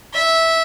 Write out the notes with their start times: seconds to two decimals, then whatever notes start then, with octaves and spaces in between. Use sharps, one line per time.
0.14 E5